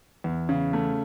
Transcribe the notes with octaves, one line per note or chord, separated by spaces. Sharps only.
E2
C#3
A3